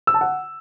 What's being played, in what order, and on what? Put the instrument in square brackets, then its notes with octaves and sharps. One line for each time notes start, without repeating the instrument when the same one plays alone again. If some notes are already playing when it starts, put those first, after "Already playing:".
[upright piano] E6
A5
F#5